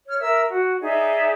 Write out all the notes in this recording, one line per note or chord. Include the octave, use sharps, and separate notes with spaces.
C#5 F6
A#4 E5 E6
F#4
D#4 G#4 D5 E5